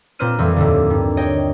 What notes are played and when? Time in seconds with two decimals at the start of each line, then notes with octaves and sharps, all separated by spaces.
0.19 A#2 C4 B4 C5 F6 D#7
0.38 F2 E3 G3 C4
0.56 D#2 A2 D3
0.90 G2
1.17 C#5 D#5 G5 A#6